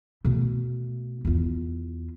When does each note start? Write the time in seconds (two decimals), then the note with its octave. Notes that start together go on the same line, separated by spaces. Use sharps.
0.24 B2 A3
1.25 E2 F4